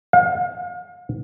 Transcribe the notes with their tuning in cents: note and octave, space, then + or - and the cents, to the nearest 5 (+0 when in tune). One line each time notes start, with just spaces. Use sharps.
F5 +40